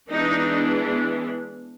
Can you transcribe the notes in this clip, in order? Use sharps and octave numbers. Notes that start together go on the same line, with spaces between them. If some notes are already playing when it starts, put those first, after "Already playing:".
E3 G#3 B3 D4 D#4